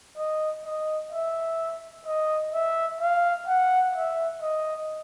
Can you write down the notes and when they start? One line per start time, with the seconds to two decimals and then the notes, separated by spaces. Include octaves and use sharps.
0.17 D#5
0.65 D#5
1.12 E5
2.06 D#5
2.53 E5
3.01 F5
3.48 F#5
3.95 E5
4.42 D#5